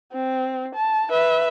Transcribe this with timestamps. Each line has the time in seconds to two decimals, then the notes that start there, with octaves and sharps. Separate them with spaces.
0.13 C4
0.75 A5
1.10 B4 E5